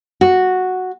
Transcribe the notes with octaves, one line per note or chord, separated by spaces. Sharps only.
F#4